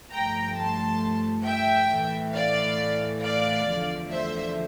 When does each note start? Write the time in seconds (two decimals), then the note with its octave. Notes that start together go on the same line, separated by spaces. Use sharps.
0.12 G2 F3 A3 G5 A#5
0.57 A5 C6
1.46 E5 G5
1.90 A2 E3 A3
2.35 D5 F5
3.23 D5 F5
3.68 E2 D3 F3 A3
4.12 C5 E5